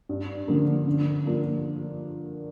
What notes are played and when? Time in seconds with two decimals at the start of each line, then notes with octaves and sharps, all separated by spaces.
0.09 G2
0.48 D3 F3 A#3 F4
0.87 D3
1.25 F3 A#3 D4 F4